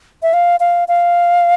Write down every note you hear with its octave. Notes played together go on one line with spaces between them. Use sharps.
E5
F5
F5
F5